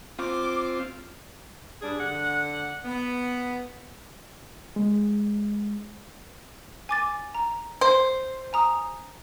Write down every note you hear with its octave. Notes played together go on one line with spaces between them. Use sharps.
C4 F4 D6
G2 D4 G#4
D3 F#5
B3
G#3
G#5 D6 A6
A#5
C5
G#5 A#5 D#6